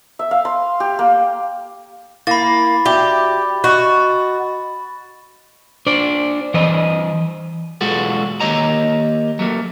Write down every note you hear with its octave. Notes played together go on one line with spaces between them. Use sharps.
E5
F5
C6
G4
A#3
A#3 E4 B5 A6
F#4 G4 D5 E5
F#4 D#5
D4 C5 D5
E3 C5 D#5
B1 E2 G#3 F4 F#4 A4
D#3 A#3 G4 C#5 D#5 A#5
F#3 A3 A#3